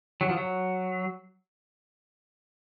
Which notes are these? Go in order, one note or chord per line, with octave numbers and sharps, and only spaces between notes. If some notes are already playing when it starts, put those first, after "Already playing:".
F#3
F3
F#3